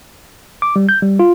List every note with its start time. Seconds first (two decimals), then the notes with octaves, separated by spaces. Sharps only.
0.62 D6
0.76 G3
0.89 G6
1.02 G3
1.19 F4